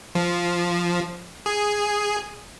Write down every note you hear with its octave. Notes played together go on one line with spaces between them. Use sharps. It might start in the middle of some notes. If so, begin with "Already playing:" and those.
F3
G#4